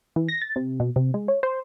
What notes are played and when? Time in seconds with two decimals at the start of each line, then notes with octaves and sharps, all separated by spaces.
0.16 E3
0.28 A#6
0.42 A6
0.56 C3
0.80 B2
0.96 C3
1.14 G#3
1.28 C#5
1.43 C5